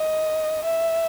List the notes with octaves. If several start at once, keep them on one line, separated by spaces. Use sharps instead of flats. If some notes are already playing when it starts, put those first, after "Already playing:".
Already playing: D#5
E5